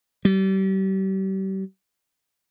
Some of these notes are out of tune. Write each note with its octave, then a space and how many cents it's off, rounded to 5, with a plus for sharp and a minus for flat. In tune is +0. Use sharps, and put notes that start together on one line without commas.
G3 -35